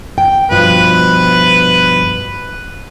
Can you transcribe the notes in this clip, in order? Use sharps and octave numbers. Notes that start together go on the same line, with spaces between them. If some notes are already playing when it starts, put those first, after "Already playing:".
G5
G2 B2 F3 B4